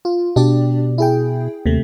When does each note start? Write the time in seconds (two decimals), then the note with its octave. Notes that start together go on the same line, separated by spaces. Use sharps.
0.05 F4
0.36 B2 D4 G4 D5
0.98 E4 G#4 G5
1.66 D#2 C3 A3